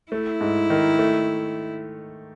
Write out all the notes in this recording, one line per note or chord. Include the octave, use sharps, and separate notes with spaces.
A3 E4
G#2
D#3
A3